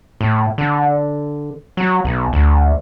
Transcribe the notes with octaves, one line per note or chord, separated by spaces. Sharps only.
A2
D3
F#3
B1
D2